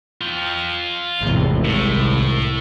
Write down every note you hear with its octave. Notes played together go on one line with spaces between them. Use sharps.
F4 G5
G#1 E2 A2 C3
C2 A2